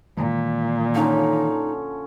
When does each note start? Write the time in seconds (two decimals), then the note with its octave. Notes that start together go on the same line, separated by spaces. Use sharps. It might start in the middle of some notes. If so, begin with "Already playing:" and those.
0.17 A#2 D#3 E3 G#3
0.95 D3 F3 C#4 D#4